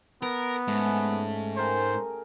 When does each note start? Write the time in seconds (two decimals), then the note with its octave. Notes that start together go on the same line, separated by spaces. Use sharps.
0.23 B3 A#4
0.68 G#2 A3 C#4
1.56 G#4 A#4 C5 G5